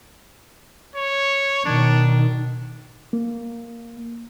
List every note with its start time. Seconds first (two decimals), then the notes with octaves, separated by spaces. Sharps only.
0.95 C#5
1.65 B2 D#3 D4
3.13 A#3